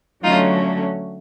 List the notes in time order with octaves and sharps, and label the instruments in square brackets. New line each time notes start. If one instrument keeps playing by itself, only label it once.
[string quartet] D3 F#3 A3 C#4 D#4 F4